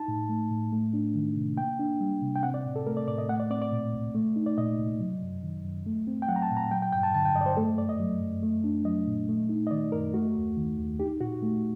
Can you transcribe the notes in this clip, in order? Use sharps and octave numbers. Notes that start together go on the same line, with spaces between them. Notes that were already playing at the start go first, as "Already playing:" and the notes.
Already playing: D#4 A5
A2
A3
A2
A3
D4
D#3
C3
A#3 G5
D4
G3
C3
G5
C4 F#5
D5
A2
A4
A3 A#4
D5
A2 D5
D#5
A3 F#5
D5
C4 D5
D5
A#2
C2
A3
D#4
D5
A#2 D#5
C2
F#3
F#2
D#3
F#2
A3
C4
G5
F#3 F#5
A#5
A5
A#2
A#5
F#3 G5
G5
G2 G5
A5
D3 A5
G5
G2 D#5
D5
C5
A3 A4
F#2 D5
D#5
F#3
F#2
A3
D4
F#3 D#5
A#2
A3
D#4
D#5
D#3 D5
F#2 A#4
A3 F#4
D#2
D#3
D#2
D#4 G4
A#2 F#4
A3